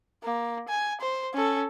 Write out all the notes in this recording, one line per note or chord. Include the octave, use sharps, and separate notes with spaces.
A#3
G#5
C5
C#4 A4